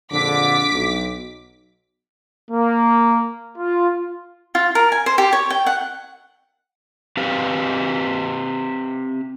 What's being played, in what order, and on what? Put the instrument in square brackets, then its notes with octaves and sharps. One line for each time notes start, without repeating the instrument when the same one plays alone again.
[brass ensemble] A#1 F2 D3 [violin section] D6 B6
[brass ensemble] B1
[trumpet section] A#3
F4
[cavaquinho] F4
A#4
G#5
C5
G4
C#5
G5
F#5
[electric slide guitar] C4 G4 B4 F5